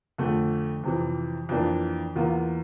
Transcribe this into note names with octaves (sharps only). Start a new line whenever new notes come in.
F2 D3 A3
F2 C3 E3
F2 E3 A#3 D4
E2 E3 A#3 F4